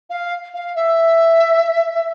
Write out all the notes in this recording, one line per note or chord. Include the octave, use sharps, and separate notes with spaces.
F5
F5
E5